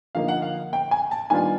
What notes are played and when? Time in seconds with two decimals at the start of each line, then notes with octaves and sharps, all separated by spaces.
0.15 D3 F3 A#3 D#4 F5
0.28 F#5
0.42 F5
0.73 G5
0.91 G#5
1.11 A5
1.30 D#3 G3 B3 D4 F4 G#5